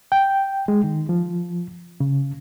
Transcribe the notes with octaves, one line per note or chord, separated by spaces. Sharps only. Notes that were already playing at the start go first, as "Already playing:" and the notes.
G5
G#3
D#3
F3
C#3